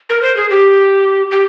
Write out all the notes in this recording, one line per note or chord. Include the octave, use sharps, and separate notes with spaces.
A#4
C5
G#4
G4
G4